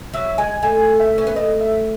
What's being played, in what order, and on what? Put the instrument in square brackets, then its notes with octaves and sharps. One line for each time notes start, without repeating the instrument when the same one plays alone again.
[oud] F#3 [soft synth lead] E5
[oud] G#3 [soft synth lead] G#5
[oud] A3 [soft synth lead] G#5
[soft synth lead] E5
[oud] C#4
B3
[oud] A3 [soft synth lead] D#5
[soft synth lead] E5